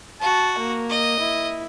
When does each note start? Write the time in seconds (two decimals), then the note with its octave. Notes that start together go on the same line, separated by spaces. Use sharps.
0.21 F#4 A5
0.59 A#3
0.89 D#5
1.20 E4